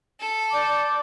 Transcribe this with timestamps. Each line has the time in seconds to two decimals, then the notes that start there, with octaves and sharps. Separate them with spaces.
0.20 A4
0.52 D5 D6 G6